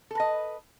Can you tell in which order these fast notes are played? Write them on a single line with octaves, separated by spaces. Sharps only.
A4 B4 D#5